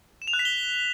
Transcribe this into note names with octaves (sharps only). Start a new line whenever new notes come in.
E7
F7
F#6
B6
G7